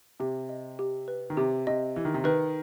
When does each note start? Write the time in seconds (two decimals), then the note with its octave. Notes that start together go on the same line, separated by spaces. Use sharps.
0.20 C3 G4
0.49 D#5
0.79 G4
1.08 B4
1.30 D#3
1.37 C3 G4
1.67 C3 D#5
1.96 E3 G4
2.05 D#3
2.14 C3
2.24 D#3 B4